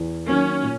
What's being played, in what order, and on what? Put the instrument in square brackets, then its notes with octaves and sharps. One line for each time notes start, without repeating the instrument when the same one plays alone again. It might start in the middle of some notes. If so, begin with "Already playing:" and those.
Already playing: [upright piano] E2
[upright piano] D#3 F#3 A#3 [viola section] C#4
[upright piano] A#2